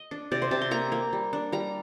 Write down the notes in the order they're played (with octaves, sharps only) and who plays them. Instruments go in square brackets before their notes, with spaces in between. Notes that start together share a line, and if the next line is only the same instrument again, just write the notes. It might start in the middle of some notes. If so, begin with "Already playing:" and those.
Already playing: [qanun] D#5
D4
C3 D5
C5
C3 A5
C6
A#3 A#5
A#3
G3
D4
G3 A#5